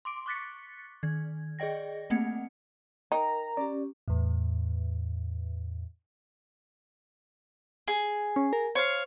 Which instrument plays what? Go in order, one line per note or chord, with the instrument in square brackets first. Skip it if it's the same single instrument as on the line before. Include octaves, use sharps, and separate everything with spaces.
[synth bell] C6 D6 D7
C#6 D6 F#6 A6 B6 C#7
D#3 G#6
G#4 D5 D#5 G5 A#6
A3 A#3 C4 F#5 G#6 C#7
[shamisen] D#4 [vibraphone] A#4 [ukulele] G5 [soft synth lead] A#5
[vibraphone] C#4 G4 [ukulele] D5
[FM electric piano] E2 A2
[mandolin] G#4
[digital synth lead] C#4
A#4
[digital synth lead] C5 [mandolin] C#5 F5